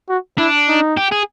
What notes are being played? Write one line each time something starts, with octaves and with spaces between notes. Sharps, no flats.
F#4
D4 E4
D#4
G4
G#4